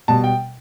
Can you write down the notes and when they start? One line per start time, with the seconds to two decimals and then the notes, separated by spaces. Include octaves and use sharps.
0.08 B2 G3 A5
0.24 G5